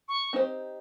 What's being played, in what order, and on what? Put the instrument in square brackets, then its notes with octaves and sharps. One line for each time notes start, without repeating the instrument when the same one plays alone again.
[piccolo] C#6
[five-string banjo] C4 D#4 G4 C5